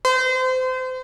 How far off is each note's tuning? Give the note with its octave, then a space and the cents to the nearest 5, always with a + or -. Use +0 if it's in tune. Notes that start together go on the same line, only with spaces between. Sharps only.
C5 -30